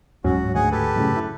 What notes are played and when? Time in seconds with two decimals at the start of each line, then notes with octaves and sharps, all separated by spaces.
0.24 D1 G#2 F#3 C#4 F#4
0.55 D2 G#4 F#5 G#5
0.72 G4 A4 B4
0.96 F#2 A2 C#3
1.16 E4